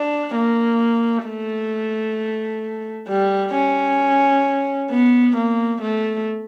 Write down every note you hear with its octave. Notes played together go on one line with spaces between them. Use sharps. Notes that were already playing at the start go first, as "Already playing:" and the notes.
Already playing: D4
A#3
A3
G3
C#4
B3
A#3
A3